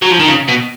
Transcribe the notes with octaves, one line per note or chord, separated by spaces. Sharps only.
F#3
F3
D#3
C#3
B2